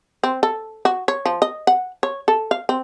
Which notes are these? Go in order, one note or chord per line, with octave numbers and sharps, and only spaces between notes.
C4
A4
F#4
C#5
F3
D#5
F#5
C#5
A4
F5
C4